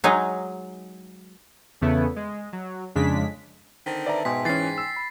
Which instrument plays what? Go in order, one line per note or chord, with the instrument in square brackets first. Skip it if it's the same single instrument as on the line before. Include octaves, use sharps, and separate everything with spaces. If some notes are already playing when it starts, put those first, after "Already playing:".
[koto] F#3 G#3 D#4
[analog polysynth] E2 C#3 A3 B3 E4
G#3
F#3
F2 C#3 G#3 D4 B6
[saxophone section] D3 D#3 C4 [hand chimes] B6
[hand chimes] B4 E5 A5 [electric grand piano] D5 A#5
[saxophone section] G#2 [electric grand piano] B2 [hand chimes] G5 G#5 C6 [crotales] B6
[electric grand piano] E3 C#4 [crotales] A6 C7
[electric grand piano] E6
[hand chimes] B5